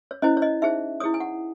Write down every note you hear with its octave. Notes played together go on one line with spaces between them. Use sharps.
C#5
C#4 E4 C5 D#5
C#5
D#5
D#4 G#4 C5 E5
E4 G#4 C#5 D#6
G#5
F#5